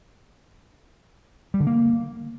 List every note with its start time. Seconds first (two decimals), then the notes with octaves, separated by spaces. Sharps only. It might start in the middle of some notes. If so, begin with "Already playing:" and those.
1.54 G3
1.60 D3
1.67 A#3